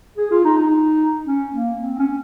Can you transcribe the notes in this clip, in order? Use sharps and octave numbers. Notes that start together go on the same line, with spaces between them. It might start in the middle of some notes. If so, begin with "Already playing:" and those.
G#4
F4
D#4
D#4
C#4
A#3
C4
C#4